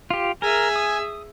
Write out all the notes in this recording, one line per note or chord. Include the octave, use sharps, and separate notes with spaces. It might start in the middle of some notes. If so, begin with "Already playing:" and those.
F4 G4
G#4 A#4 E5 G#5
D#6